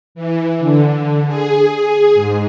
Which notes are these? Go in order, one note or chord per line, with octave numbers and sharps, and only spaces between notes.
E3
D3
G#4
G#2